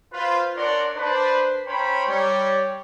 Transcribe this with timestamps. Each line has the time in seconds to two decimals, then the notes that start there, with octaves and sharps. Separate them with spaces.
0.13 F4 B4 C5
0.56 D4 A#4 C#5 D5 F#5 C6
0.96 D4 B4 C5
1.66 C#4 C5 C#5 G5 A#5 B5
2.07 G3 C#5